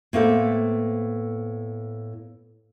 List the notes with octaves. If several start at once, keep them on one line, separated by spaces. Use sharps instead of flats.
A2 A#3 B3 A4 C5